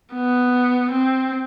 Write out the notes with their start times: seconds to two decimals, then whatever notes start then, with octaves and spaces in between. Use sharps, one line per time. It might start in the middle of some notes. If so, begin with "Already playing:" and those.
0.13 B3
0.91 C4